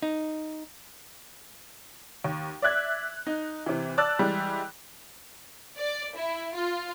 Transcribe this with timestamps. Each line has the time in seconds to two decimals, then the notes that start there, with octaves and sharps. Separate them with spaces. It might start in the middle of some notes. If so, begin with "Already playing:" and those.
0.02 D#4
2.24 D#2
2.62 D5 E5 F#6 G#6
3.26 D#4
3.66 C3 E3
3.98 D5 A5 E6 F#6 A6
4.19 E3 G3 G#3
5.76 D5
6.15 E4
6.54 F4